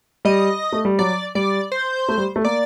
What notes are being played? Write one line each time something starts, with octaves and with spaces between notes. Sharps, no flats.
G3 D#5
A3
G3
F#3 D5
G3 D5
C5
A3
G3
A3
A#3 D5